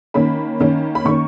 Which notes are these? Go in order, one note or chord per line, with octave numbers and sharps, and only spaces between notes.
D#3 A#3 C#4 B5
D#3 A#3 C#4
B5
D#3 A#3 C#4 C#6